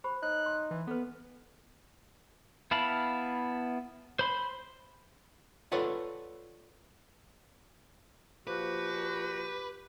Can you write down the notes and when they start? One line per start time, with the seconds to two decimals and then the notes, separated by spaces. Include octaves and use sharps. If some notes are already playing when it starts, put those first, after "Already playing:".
0.04 G4 C5 B5
0.23 D#4 C#5 F#6
0.46 C6
0.71 E3
0.87 B3 A4 B4
2.71 B3 E4 F5 A5 B5
4.19 C5 B5 C6
5.72 F4 A4 B4 C#5 D5 F#5
8.47 A#2 F3 F#4 G4 B4